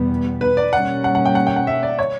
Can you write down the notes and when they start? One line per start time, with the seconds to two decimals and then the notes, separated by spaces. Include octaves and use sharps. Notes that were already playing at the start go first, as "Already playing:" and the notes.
Already playing: E2 B2 G3 B3
0.41 B4
0.57 D5
0.73 B2 G3 A#3 C#4 F#5
1.04 F#5
1.15 F#5
1.26 G5
1.35 F#5
1.47 G5
1.56 F#5
1.67 E5
1.83 D5
1.99 C#5